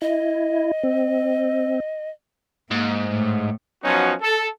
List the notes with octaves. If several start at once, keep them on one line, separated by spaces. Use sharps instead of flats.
E4 D#5
C4
G#2 A#3
A2
F3 F#3 B3 C#4 D#4 F#4
A4